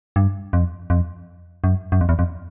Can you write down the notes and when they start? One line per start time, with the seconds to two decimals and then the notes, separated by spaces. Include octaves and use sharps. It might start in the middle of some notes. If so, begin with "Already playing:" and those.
0.16 G2
0.53 F2
0.90 F2
1.64 F#2
1.92 F#2
2.01 F2
2.09 E2
2.19 F2